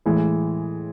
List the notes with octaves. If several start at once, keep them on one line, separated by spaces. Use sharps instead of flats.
A2 E3 G#3